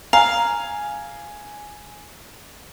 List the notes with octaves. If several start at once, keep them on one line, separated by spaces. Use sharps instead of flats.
F5 G#5 A#5